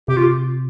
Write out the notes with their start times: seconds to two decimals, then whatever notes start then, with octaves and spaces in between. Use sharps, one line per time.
0.08 C3 G4
0.17 F4